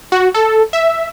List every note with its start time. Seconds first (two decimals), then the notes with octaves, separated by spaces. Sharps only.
0.12 F#4
0.34 A4
0.73 E5